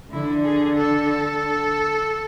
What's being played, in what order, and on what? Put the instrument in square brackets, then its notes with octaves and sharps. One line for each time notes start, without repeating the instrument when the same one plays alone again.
[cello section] D3 [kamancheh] E4
[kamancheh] G#4
A4